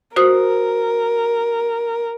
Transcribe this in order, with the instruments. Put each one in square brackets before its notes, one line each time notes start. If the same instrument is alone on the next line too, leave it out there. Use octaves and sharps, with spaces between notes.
[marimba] F#4 C5 D#6 [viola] A#4